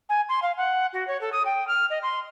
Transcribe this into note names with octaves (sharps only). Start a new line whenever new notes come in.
G#5
C6
F5
F#5
F#4
C#5
A4
D#6
G5
F6
D#5
C6